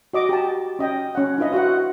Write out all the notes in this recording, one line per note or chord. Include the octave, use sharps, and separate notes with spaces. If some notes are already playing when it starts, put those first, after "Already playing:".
F#4 D#5 D6
G4 A5
C#4 D#5 G5
C#4 F#5
D4 E4 F4 B4 D#5
F4 F#4 E5 F#5